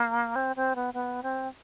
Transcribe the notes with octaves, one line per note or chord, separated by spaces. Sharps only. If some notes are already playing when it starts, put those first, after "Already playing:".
Already playing: A#3
C4
C4
B3
B3
C4